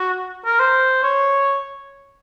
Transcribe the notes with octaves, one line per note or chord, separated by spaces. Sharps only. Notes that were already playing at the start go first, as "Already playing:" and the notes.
Already playing: F#4
A#4
C5
C#5